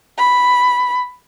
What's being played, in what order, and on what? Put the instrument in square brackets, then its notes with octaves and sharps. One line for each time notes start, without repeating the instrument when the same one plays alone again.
[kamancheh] B5